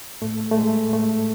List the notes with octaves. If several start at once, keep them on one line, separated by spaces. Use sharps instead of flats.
A2 A3
A3
A2 G#3
A2 A3